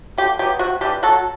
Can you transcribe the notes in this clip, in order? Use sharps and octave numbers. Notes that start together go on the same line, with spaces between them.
D3 G4
F#3 B3 G4
C3 F#4
E3 G3 D4 G4
F#3 F#4 A4